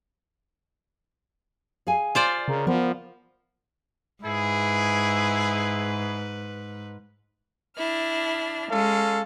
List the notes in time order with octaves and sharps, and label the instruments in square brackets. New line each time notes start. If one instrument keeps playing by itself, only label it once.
[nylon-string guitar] G#4 F5 G#5
[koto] F4 C5 D5
[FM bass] C#3 [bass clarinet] A#4
[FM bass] F3 [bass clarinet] B3 [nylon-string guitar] A#4
[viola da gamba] G#2 B4 [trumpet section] E4 G#4
[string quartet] D4 E4 F6
[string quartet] G#3 [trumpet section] C#4 A4 F5